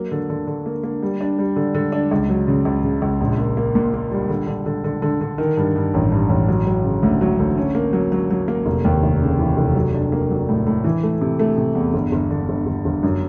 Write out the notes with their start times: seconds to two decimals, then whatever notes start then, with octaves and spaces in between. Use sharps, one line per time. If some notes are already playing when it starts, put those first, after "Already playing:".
Already playing: F#3 A#3
0.12 D3
0.30 D3
0.47 D3
0.66 A#3
0.83 A#3
1.03 G3
1.21 D4
1.39 G3
1.56 D3
1.75 D3
1.92 D4
2.11 C#2
2.30 F#3
2.48 C#3
2.65 C#2
2.84 C#3
3.02 C#2
3.21 A#1
3.38 A#3
3.57 A#3
3.75 A#2
3.94 A#3
4.11 G3
4.29 D3
4.47 D3
4.66 D3
4.84 D3
5.02 D3
5.21 D3
5.38 D#3
5.57 G2
5.76 G2
5.94 A1
6.11 G2
6.29 A1
6.48 F#3
6.67 F#3
6.84 C#3
7.03 D2
7.21 F#3
7.39 D2
7.57 C#4
7.75 A#3
7.93 F#3
8.12 F#3
8.30 F#3
8.48 A#3
8.66 F1
8.85 D#2
9.03 F1
9.21 C#3
9.39 E3
9.57 F1
9.76 F#3
9.94 D4
10.12 A#3
10.30 F#3
10.49 A2
10.67 A2
10.84 E3
11.03 A3
11.21 C3
11.39 A3
11.58 C3
11.75 E2
11.94 G1
12.12 G1
12.31 D3
12.49 G1
12.66 G1
12.85 G1
13.03 F#2